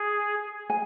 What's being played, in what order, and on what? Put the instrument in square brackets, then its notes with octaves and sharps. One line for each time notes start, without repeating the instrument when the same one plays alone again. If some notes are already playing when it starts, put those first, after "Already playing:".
Already playing: [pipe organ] G#4
[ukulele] G#5